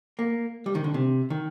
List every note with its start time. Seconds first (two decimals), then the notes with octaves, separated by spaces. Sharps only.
0.19 A#3
0.66 G3
0.75 D#3
0.84 D3
0.94 C3
1.30 D#3